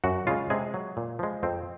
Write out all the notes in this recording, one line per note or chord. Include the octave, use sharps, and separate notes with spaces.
F#2 F#4 F#5
C#3 G#3 F4 F5
C3 G#3 G#4
F#3
A#2
F3 G#3
F2 C4